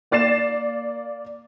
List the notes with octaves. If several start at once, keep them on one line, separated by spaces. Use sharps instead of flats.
A#3 D5 A6 C7 E7